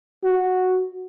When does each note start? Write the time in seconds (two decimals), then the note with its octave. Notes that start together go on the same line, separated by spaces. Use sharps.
0.24 F#4